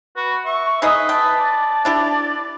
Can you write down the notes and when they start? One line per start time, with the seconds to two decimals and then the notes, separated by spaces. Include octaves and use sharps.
0.16 F#4 B4
0.45 E5 C#6
0.82 D#4 G#4 B4 D#5
1.09 G5 A5
1.40 D5
1.85 D4 E4 G4